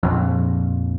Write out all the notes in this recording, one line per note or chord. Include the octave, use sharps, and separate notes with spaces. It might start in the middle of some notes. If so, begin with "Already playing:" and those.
A#1 F2